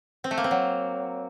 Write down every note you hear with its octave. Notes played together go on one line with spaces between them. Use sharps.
C4
A3
A#3
C4
F#3